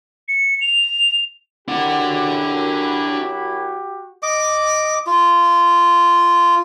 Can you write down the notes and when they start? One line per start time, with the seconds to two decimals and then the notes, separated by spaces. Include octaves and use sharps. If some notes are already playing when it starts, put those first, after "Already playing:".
0.28 C#7
0.61 F7
1.68 F#2 D4 E4 F#4 G4 F#5
4.23 D#5 D6
5.07 F4